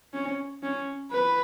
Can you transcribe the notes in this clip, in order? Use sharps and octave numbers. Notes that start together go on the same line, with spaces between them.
C#4
C#4
B4